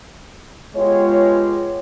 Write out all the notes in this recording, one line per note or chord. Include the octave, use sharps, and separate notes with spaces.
G#3 B3 F4 G4 C#5